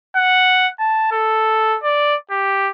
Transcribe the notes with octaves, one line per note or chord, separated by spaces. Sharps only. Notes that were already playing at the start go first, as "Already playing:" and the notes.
F#5
A5
A4
D5
G4